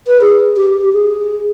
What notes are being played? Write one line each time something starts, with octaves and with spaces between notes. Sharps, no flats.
B4
G#4
G4
G4
G#4